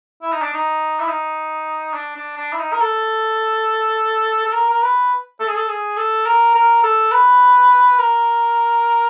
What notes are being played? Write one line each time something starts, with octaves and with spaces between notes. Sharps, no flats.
E4
D#4
D4
D#4
E4
D#4
D4
D4
D4
E4
D#4
A#4
A4
A4
A#4
A#4
B4
A4
G#4
A4
G#4
A4
A#4
A#4
A4
B4
A#4